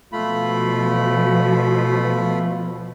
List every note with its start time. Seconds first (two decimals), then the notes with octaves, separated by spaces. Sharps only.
0.12 B2 F3 A3 F4 B5